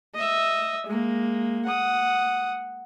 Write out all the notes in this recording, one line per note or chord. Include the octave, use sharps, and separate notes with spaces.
D#5 E5
G#3 A#3
F#5 D#6